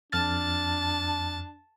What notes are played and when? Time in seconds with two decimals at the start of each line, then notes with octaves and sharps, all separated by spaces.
0.12 F2 D4 A5 F6 A6